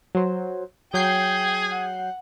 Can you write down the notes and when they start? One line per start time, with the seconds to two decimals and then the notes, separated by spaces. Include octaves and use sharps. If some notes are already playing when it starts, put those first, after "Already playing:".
0.15 F#3 C5
0.94 F#3 G#4 G5 G6 C7
1.70 F#5